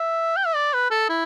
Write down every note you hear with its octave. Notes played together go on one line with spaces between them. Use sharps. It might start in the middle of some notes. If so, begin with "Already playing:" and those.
Already playing: E5
G5
E5
D5
B4
A4
E4